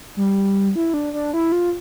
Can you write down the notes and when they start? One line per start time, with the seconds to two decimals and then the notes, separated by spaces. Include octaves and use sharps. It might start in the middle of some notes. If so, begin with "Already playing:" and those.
0.17 G3
0.76 E4
0.94 D4
1.13 D4
1.33 E4
1.52 F4